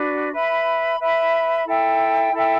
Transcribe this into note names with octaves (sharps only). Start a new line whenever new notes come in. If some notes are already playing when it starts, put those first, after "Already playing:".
Already playing: D4 F#4 B4 D5
B4 E5 B5
B4 E5 B5
E4 A4 E5 G5
E4 A4 E5 G5